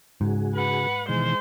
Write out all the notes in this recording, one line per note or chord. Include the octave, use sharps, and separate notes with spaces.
G#2 C#3 F#4 G#4
B4 F#5
B2 D#3 E3 G#3 C5